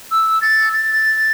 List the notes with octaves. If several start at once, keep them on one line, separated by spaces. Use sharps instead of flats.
E6
A6
A6